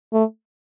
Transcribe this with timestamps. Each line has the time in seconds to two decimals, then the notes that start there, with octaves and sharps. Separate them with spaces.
0.13 A3